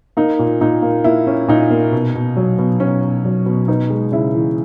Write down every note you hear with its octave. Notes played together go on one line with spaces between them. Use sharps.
A#3 D#4
A#2
A#2 D#4
A#3
A#3 E4
C#4
A#2 D#4
A#3
B2
B2
F#3
B2
B2 C#4
B2
F#3
B2
B3 D#4
G#3
C#3 E4
E3